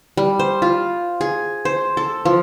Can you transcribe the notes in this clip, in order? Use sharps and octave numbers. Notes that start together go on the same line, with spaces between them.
G3
C5
F4
G#4
C5
A4
F3